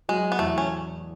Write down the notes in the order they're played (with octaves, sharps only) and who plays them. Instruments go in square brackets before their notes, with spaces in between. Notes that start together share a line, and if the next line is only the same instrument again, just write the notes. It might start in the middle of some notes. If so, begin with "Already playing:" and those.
[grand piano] F#3 [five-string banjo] G#3
[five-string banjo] B3
[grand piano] E2 [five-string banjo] A3
[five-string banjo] C#4